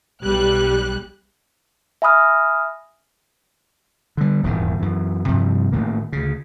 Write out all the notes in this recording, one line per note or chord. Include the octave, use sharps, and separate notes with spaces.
B1 G3 F#6
E5 G#5 B5 D#6 F6
D3 G3
D#1 E2 G#2 D#3
F#2 E3
G2 C3 F3 G3
G#1 A2 D#3 A#3
D2 C#3